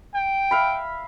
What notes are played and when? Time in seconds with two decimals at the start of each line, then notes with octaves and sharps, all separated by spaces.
0.14 G5
0.51 E5 F5 B5